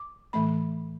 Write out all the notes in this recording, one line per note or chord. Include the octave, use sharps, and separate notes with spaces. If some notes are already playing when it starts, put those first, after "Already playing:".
Already playing: D6
A2 E3 A3 B5